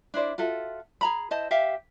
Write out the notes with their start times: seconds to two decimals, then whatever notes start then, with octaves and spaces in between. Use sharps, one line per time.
0.14 D4 E4 C5 D5
0.38 F4 F#4 A4 E5
1.01 G#4 A#5 B5
1.31 E4 C5 D#5 A5
1.51 G4 E5 F5